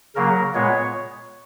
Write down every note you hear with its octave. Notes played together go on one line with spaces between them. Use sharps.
C#3 F#3 A#3 A#4
A#2 G#3 B3 C#5